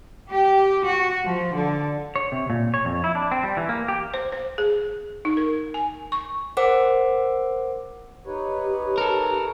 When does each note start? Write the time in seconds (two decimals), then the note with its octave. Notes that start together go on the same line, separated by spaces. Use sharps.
0.30 G4
0.83 F#4
1.24 F3
1.56 D3
2.16 C#5
2.32 C3
2.50 A#2
2.74 C#5
2.85 F2
3.04 E4
3.15 D4
3.31 C4
3.44 G3
3.57 E3
3.69 A#3
3.88 G4
4.14 C5
4.32 C5
4.58 G#4
5.25 D#4
5.37 A#4
5.74 G#5
6.12 C#6
6.57 A#4 C5 F#5 D6
8.26 D#4 G4 B4 C#5
8.98 A4 A#4